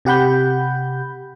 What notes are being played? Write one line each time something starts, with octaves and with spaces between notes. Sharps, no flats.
C3 G4 F#5 B5 G6